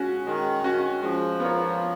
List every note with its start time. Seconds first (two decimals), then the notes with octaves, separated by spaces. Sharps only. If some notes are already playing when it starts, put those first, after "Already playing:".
Already playing: G#3 C#4 F#4
0.26 D#3 G#3
0.64 C#4 F#4
1.02 F3 G#3
1.40 B3 F4 A#4 C#5